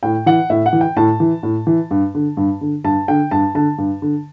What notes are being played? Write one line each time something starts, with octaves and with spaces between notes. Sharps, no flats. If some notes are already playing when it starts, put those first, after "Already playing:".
A2 G5
E3 F#5
A2 E5
F#5
E3
G5
A2 A5
E3
A2
E3
G2
D3
G2
D3
G2 A5
D3 G5
G2 A5
D3 A5
G2
D3